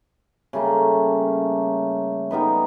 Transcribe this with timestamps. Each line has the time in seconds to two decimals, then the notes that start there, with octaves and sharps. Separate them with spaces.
0.53 C#3 G3 A3 A#3
2.31 G3 B3 D#4 B4